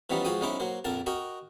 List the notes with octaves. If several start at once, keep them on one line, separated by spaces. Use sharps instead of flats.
E3 F3 G3 B3 C#4 D#4
F3 G#3 F#4 G5 D#6
B1 C#4 D#4 E4 C5 D6
F#3 A#3 C5
A#1 F2 A#4 A5
F#4 A#4 D#5 G5